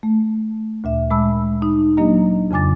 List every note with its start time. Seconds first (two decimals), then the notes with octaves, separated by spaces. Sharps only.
0.03 A3
0.84 D2 A#2 E5
1.10 A#2 G#3 A5 B5 E6
1.62 D#4
1.97 F#3 A#3 D4 G4 D#5 A#5
2.51 F2 C#3 G#5 D6 A6